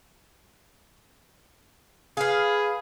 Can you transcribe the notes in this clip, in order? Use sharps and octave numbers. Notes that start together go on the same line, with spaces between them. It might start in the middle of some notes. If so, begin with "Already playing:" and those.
G#4 B4 F5